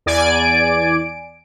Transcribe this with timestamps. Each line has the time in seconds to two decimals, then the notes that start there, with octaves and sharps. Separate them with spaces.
0.06 E2 D5 G#5 D7